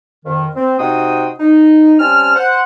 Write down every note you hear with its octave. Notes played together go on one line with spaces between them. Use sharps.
F2 D#3
C4
C3 D#4 F#4 C5 G5 D#6
D#4
G3 C4 C#4 A5 F6
C5 F#5